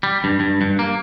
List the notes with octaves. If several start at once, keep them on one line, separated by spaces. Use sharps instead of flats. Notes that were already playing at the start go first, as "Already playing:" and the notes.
G3
G2
G2
G2
A#3